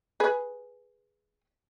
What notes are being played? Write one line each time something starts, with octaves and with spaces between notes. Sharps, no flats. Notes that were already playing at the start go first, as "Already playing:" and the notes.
G#4 B4